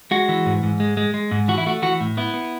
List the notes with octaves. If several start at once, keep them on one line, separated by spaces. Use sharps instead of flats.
G#3 F#4
E3
G#2
G#2
G#3
G#3
G#3
G#2
E3 F#4
E4
A3 F#4
E3 F#4
A2
B3 E4
B3